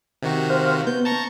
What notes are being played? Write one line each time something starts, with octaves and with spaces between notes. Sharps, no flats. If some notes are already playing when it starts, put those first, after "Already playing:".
C3 D#3 F#4
C5 F5
B3 G6
A5 A#5 C#6